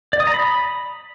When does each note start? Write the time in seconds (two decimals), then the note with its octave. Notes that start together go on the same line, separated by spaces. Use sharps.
0.13 D5
0.20 D#6
0.27 A#5
0.34 B5